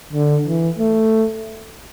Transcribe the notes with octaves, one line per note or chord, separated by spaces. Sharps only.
D3
E3
A3